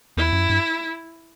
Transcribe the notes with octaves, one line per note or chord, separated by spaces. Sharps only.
E2 E4
F#2
G2